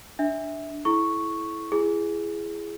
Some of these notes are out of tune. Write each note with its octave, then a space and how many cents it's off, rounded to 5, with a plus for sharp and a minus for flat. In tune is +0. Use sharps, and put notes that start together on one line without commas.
D4 +0 E5 -15
E4 +0 A4 -35 C#6 +0
E4 +35 G#4 +0